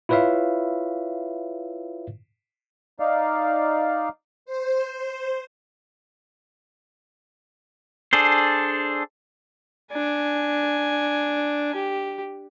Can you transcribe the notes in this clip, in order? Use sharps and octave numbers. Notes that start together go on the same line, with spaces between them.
E4 F4 B4 C#5 E5 F5
D#4 D5 F5
C5
D4 G#4 A4 C5
D4 G#5
G4